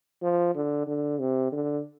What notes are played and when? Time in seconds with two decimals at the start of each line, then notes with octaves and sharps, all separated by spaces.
0.23 F3
0.55 D3
0.87 D3
1.19 C3
1.52 D3